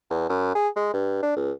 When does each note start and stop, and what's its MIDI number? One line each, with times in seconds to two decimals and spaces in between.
0.10 0.27 40
0.29 0.53 42
0.55 0.68 68
0.76 0.92 56
0.94 1.18 43
1.22 1.36 62
1.36 1.52 37